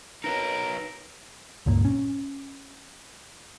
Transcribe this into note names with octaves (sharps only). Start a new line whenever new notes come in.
D#4 A#4 B4 C#5
C#2 G2 A#2 A#3
C#4